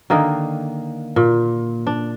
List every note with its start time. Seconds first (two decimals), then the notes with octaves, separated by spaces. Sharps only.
0.10 D3 D#3 A#3 D#4
1.16 A#2
1.87 D4